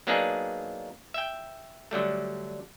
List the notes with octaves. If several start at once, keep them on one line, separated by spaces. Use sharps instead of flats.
F#3 A#3 B3 D4 D#4 G#4
E5 G5
D3 F#3 G3 A3